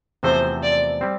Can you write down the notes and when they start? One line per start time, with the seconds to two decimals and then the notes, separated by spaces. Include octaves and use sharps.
0.23 E2 C3 F3 A3 C4 C5
0.63 D5
1.01 G3 C4